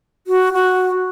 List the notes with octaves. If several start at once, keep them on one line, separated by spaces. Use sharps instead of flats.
F#4
F#4